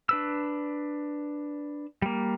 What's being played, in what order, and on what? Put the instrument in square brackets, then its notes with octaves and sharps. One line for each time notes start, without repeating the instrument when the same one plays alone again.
[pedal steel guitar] D4 B4 E6
G3 A#3